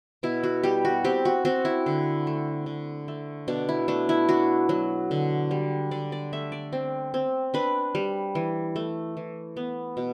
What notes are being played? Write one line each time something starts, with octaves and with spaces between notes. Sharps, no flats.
B2 E4
F#4
G3 G4
F#4
C4 G4
F#4
C4 F#4
E4
D3
A3
D3
A3
B2 D4
E4
A3 D4
E4
D4 F#4
F#3
D3
G3
D3 D5
D5
A3 E5
D5
C4
C4
D4 B4
G3
E3
A3
E3
B3
B2